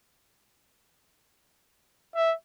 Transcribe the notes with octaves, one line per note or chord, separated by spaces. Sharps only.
E5